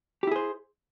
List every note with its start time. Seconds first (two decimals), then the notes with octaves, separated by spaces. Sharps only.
0.23 G4
0.27 E4
0.31 G#4
0.36 C5